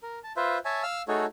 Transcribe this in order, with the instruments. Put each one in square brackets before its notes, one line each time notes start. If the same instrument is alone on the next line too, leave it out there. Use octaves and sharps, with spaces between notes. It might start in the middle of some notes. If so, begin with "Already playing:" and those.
[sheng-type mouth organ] A#4
A5
F4 B4 C5 E5
C#5 E5 G#5 A5
F5 E6 F6
A3 D#4 F#4 G#4 A4 C#5